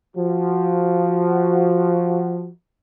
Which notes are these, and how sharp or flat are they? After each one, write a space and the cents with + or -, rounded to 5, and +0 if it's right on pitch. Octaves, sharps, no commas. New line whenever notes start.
F3 +0 F#4 +10